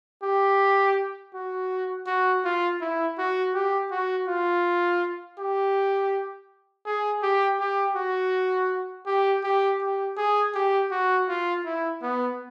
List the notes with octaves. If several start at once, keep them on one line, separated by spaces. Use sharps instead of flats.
G4
F#4
F#4
F4
E4
F#4
G4
F#4
F4
G4
G#4
G4
G4
F#4
G4
G4
G4
G#4
G4
F#4
F4
E4
B3